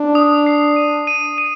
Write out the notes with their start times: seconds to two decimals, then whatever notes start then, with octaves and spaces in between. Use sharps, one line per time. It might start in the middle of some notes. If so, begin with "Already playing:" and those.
Already playing: D4
0.15 D#6
0.46 C7
0.76 D#7
1.07 D#7
1.38 D#7